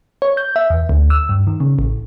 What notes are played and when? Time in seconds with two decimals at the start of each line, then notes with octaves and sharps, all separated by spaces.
0.22 C#5
0.37 G6
0.56 E5
0.70 E2
0.89 D2
1.10 E6
1.29 G2
1.47 D#3
1.60 C#3
1.79 A1